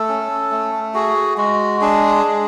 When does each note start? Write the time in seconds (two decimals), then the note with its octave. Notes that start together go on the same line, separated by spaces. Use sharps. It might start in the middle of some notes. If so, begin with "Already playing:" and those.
Already playing: A3 A4
0.09 C#4
0.51 A3
0.94 F#4 G#4
1.37 G#3 F#4
1.81 D4 G#4
2.24 G#3